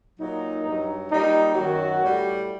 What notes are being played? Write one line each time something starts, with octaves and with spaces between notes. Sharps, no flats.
A#2 F#3 D#4
G2 F#3
A#2 G3 D#4
F#2 D#3 F#3 F#4
A2 G3